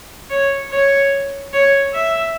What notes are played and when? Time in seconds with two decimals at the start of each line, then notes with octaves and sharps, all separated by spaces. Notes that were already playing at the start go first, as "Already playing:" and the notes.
0.30 C#5
0.71 C#5
1.53 C#5
1.94 E5